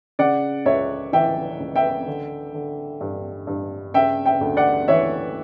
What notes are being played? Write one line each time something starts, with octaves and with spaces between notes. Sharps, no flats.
C#3 D5 F#5
C#2 C#5 E5
E3 E5 G5
C#2
E5 G5
D3
D3
G2
G2
C#3 E5 G5
E5 G5
D2
D5 F#5
E3 C#5 E5